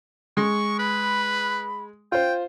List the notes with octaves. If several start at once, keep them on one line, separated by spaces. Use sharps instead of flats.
G#3 C#6
B4 B5
F4 C5 G5